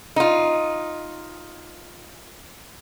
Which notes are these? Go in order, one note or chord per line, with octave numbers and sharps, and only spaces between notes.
D#4 F4